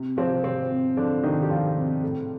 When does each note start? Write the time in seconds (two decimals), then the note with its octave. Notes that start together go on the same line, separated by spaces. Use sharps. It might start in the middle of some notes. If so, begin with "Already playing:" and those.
Already playing: C3
0.17 C3 F3 C4
0.44 C3 F3 C4
0.71 C3
0.97 D3 F3 D4
1.23 C3 D#3 D#4
1.42 G4
1.50 F3 F4
1.77 C3
2.03 A2